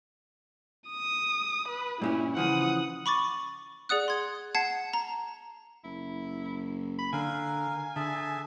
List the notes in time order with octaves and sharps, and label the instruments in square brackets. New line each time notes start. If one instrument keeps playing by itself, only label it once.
[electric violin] D#6
B4
[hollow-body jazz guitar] G2 A#2 C#4 [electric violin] E4
[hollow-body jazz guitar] C#3 E3 F3 [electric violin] F#5 D#6
[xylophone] B5 C#6 D6 A6
G#4 D5 F#5 D#6 F#6
C6 G#6
F#5 A5 G#6 C7
A5 A#5
[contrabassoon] F#1 [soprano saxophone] E4
[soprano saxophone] B5
[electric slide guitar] D3 [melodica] A#4 F5 [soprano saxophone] G#5
[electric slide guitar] D3 [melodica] G#4 E5 A5